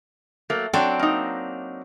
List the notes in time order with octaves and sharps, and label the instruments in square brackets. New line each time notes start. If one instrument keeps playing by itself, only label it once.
[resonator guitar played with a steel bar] F#3 A3 A#3
[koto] F#3 C4 D4 [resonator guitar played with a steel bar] D5
[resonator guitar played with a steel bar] A#3 D#4